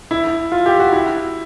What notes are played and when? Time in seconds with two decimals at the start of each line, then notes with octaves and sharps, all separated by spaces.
0.11 E4
0.52 F4
0.66 G4
0.80 F#4
0.92 E4